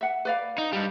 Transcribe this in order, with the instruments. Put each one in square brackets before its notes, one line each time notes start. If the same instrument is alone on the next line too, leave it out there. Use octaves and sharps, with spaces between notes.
[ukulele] E5 F#5
B4 D5 F5
[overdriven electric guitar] D#4
G2 G3